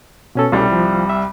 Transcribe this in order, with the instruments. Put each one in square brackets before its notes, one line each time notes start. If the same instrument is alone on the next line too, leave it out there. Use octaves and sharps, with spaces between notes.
[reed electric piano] B2 C#4 A4
[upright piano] C2 G3
[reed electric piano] F3
E5